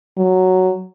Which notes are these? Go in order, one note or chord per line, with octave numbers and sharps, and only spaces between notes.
F#3